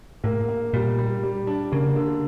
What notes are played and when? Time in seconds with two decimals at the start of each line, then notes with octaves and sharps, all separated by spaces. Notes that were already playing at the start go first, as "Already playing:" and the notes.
0.24 A2 A#3
0.49 A#3
0.74 A#2 G3
0.99 G3
1.23 G3
1.47 D4
1.72 C#3 A#3
1.96 D3